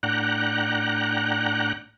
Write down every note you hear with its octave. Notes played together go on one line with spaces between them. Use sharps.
A2 D4 F#5 G5 A#5 F#6